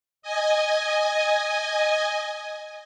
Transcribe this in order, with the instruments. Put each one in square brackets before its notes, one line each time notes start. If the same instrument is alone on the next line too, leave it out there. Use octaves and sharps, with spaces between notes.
[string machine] D#5 G#5